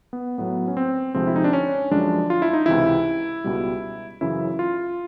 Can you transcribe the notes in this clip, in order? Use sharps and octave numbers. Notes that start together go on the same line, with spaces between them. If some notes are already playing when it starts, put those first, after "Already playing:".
B3
A2 F#3 B3
C#4
C4
D2 C3 F3 G#3 C4
E4
D#4
D4
C#4
F#2 D3 F3 G#3 D4
F4
E4
D#4
C#2 C3 E3 E4
C#2 B2 G3
F#2 C#3 E3 E4
F4